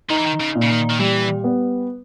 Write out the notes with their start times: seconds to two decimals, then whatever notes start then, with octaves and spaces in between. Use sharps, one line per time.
0.10 D#3 D#4
0.18 E3
0.26 D#3
0.40 C#3
0.55 A#2
0.62 C#3
0.70 D#3
0.90 D#3
0.99 E3 G3
1.44 B3